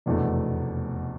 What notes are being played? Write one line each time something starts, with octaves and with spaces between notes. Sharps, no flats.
F1 E2 B2 A3 D4